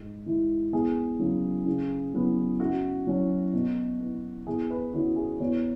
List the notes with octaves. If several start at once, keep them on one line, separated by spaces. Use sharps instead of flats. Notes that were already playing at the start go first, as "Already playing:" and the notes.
Already playing: G#2
E3 G#3
E2 G#4
C#3 F#3
C#3
F#3 B3
F#2 F#4
F#3 C#4
B2
B3
E2 G#4
B4
C#3 E3 C#4 F#4
G#4
E2 C#5